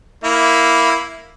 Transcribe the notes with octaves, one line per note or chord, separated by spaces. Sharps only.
A#3 E4